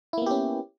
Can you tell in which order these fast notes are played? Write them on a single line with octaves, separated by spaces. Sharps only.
E4 A#3 B3 G4 C#4